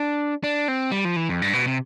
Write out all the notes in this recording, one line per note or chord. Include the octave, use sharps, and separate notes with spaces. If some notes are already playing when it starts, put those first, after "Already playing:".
Already playing: D4
D4
C4
G3
F3
E3
F2
G2
B2
C3